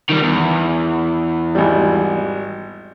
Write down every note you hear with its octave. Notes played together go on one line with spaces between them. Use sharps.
D#3 G3
E2
G#1 G3